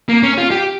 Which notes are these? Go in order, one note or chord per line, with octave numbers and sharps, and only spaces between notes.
A#3
C#4
F4
G4